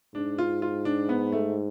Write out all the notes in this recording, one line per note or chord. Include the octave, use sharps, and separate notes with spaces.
G#2 D4
F4
F4
D4
B3
A3